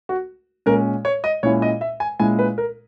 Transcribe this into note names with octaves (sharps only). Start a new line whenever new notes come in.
F#4
A#2 G#3 C#4 A#4
C#5
D#5
A#2 G#3 C#4 E4 C#5
D#5
E5
G#5
A#2 G#3 C#4 E4 G#5
B4
A#4